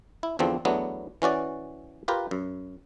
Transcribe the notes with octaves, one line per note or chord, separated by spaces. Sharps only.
E4
E2 D3 F3 C4
E2 F#3 A3 B3 D4
E3 C#4 F#4 D5
F4 G4 A#4 B4
F#2